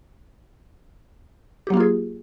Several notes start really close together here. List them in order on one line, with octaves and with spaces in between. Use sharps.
G4 F#3 A#3 F4 G#4